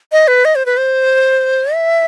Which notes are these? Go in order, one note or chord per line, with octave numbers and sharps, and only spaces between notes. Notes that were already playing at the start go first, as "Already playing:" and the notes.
D#5
B4
D#5
C5
B4
C5
E5